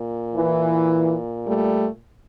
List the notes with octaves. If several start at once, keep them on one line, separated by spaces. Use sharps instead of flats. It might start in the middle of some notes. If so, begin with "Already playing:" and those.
Already playing: A#2
E3
G3 A3